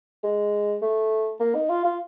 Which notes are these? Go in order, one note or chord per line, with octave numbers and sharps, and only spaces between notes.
G#3
A3
A#3
D#4
F4
F4